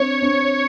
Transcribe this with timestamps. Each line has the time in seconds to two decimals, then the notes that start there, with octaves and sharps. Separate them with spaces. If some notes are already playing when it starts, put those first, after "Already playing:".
Already playing: C4 D4 C#5
0.22 C4 D4